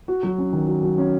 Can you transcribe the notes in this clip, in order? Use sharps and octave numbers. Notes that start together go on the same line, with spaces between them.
F#4
F#3
C#4
D#3
F#4
F#3
C#4